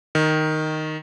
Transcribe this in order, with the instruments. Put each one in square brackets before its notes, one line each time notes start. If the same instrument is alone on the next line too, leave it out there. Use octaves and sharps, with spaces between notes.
[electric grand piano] D#3